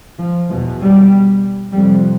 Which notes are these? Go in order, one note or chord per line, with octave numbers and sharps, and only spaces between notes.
F3
E2 B2 F3
G3
F2 C3 G3